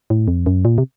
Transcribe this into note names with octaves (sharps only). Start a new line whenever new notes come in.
A2
F2
F#2
A#2
C3